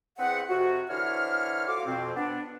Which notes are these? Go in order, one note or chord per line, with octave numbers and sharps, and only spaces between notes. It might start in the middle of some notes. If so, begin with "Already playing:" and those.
E2 C4 G#4 B4 F#5
F2 C3 C4 F#4
D3 E3 C5 C#5 F6
F4 F#4 A4 F5 D6
F2 B2 C4
B3 D4